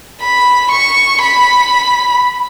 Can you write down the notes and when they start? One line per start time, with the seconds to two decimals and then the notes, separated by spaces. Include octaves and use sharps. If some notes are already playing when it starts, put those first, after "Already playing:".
0.22 B5
0.72 C#6
1.23 B5